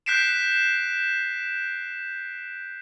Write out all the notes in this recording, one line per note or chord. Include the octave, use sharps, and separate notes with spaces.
F#6 G6 B6 C7 D7 E7